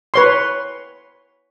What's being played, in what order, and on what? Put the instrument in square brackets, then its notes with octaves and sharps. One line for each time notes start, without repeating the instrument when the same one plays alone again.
[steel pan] B4 C#5 C6